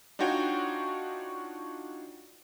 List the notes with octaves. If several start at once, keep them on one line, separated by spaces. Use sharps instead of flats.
D4 D#4 F4 F#4 C#5 G5